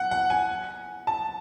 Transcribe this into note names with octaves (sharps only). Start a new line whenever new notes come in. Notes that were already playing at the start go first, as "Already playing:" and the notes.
Already playing: F#5
F#5
G#5
A5